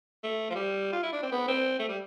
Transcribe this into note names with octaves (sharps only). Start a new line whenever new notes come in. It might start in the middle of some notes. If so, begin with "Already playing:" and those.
A3
F3
G3
F4
E4
D4
C4
B3
C4
A3
G3